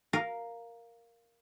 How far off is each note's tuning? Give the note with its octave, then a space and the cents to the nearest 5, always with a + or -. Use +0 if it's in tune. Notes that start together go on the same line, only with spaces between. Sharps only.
A#4 +0 F5 +0